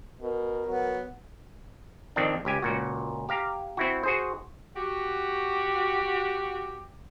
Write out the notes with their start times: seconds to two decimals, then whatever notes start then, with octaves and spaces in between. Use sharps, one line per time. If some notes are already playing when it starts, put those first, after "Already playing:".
0.21 B2 A#4
0.66 F#3 B3
2.16 F2 D#3 C4 D4
2.45 C#2 G4 G#5
2.62 C#2 A#2 F#4
3.29 G4 F5 A#5
3.77 C4 E4 F#4
4.03 F#4 G#4 C5
4.76 F#4 G4